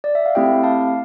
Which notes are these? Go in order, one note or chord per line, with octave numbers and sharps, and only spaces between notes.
D5
E5
F5
A3 C4 E4 G4 E5 G5
F5 A5